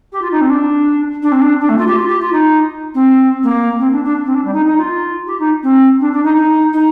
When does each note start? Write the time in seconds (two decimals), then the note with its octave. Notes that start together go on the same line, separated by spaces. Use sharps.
0.12 G4
0.21 F4
0.31 D#4
0.41 C4
0.49 D4
1.22 D4
1.31 C4
1.41 D4
1.60 D4
1.69 A3
1.78 F4
1.87 G4
1.95 F4
2.08 G4
2.20 F4
2.32 D#4
2.94 C4
3.43 A#3
3.79 C4
3.92 D4
4.04 D4
4.25 C4
4.34 D4
4.44 G3
4.53 D#4
4.65 D#4
4.77 F4
5.26 G4
5.39 D#4
5.62 C4
6.00 D4
6.12 D4
6.24 D#4
6.36 D#4
6.73 D#4